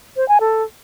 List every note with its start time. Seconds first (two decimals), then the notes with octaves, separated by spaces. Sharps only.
0.16 C5
0.28 G#5
0.40 A4